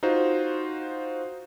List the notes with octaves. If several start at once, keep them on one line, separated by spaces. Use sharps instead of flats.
D#4 F4 F#4 C5